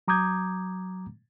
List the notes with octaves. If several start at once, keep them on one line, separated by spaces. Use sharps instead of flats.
F#3 A#5 D6 D#6 G6 G#6